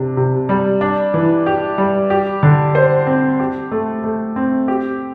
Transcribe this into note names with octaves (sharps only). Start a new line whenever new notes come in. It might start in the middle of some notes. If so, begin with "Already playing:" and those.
Already playing: C3 D4
C3
G3
D4
E3
G4
G3
G4
D3
C5
C4
G4
A3
A3
C4
G4